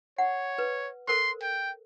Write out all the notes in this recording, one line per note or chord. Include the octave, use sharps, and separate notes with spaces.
C#5 F#5
B4
A4 A#4 C5 C6
G5